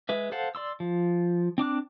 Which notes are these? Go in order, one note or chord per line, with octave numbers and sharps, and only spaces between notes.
G#3 B4 E5
A4 C5 F5 F#5 A5
D5 C6 E6
F3
C4 D4 D6 F#6